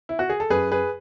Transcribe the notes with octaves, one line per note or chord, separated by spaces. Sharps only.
E4
F#4
G#4
A4
F#2 G#4 B4
G#4 B4